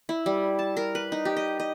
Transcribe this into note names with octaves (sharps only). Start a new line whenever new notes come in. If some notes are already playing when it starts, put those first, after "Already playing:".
E4
G3
A5
A#4
B4
D#4
G4
D#5
D#5